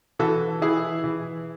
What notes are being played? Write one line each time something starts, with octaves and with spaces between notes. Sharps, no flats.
E3 F#4 A4
E3 E4 G#4
E3